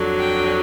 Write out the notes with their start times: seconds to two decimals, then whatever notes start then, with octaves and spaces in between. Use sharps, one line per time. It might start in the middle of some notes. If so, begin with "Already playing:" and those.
Already playing: F2 D3 F#3
0.19 G5